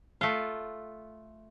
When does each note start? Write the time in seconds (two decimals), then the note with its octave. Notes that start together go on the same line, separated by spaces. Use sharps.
0.21 A3 F4